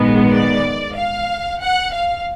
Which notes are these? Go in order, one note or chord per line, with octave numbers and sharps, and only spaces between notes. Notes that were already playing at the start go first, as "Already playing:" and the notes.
Already playing: A#1 G#2 D#3 G#3 B3
D5
F5
F#5
F5